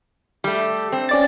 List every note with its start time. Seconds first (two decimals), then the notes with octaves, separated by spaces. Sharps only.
0.44 G3 A3
0.92 C4
1.09 C#4 D5 A6